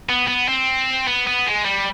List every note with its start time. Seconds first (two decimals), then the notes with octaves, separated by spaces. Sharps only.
0.09 B3
0.28 B3
0.48 C4
1.07 B3
1.27 B3
1.47 G#3
1.65 G3